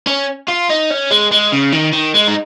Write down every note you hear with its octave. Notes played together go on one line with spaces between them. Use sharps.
C#4
F4
D#4
C#4
G#3
G#3
C#3
D#3
D#3
G#3
D#4